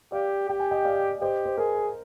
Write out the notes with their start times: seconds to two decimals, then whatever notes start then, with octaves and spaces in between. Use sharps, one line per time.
0.12 G4 D5 F5
0.49 G4 G5
0.60 G#5
0.71 D#5 G5
0.85 D5 F5
1.21 G4 C5 D#5
1.45 C5
1.57 G#4 A#4